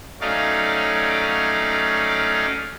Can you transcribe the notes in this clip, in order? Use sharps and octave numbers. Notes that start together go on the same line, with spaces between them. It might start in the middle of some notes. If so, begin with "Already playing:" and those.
F#3 A3 C#4 D#4 D5 F5